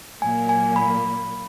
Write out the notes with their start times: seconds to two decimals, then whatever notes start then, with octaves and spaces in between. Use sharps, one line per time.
0.22 A#2 F#3 A#3 G#5
0.49 G#5
0.76 B5